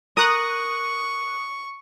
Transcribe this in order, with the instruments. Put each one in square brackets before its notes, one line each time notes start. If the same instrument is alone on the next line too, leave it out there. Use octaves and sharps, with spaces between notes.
[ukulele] A#4 [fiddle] C#6 [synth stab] D#6 F#6